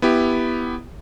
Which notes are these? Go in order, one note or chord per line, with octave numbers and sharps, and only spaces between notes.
B3 E4 G4